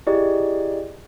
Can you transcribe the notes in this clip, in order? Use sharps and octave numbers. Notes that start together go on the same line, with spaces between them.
E4 G4 G#4 D5 D#5